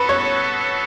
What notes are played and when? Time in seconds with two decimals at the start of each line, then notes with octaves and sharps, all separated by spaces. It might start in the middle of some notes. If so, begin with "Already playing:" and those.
Already playing: B3 F#4 A4 B4
0.09 C#5